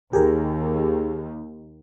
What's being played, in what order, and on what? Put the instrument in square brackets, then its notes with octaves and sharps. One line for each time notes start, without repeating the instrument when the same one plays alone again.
[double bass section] D#2 [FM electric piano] G4 G#4 A#4